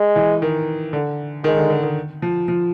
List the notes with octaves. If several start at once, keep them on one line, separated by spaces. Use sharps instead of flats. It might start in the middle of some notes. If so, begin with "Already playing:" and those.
Already playing: G#3
E3
D#3
D3
D#3 G#3
D3
D3
D#3
F3
F3